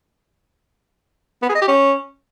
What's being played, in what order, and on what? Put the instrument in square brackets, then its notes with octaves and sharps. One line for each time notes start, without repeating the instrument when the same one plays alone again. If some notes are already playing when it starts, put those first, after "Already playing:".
[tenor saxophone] B3
G#4
D#5
G4
C#4